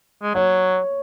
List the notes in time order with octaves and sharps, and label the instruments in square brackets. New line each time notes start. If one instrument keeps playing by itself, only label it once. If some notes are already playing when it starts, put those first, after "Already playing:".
[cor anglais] G#3
[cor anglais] F#3 [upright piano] C#5